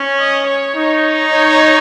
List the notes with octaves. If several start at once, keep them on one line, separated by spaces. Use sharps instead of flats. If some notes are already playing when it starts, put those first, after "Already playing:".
Already playing: C#4
D#5
C#5
D#4
C#5